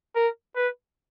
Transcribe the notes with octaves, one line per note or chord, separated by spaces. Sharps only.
A#4
B4